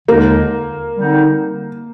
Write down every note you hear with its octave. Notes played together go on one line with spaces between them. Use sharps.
D#2 D3 G#3 A#3 D#4 A#4
D3 G3 C4 D#4